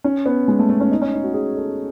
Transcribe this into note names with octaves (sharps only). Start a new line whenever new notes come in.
C#4
B3
G#3
A3
A3
C#4
D#4
C#4
D#4
F#4
G#4
A4